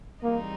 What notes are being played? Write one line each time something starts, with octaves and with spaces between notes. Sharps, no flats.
E3 G3 A#3 C4 D#4 G#4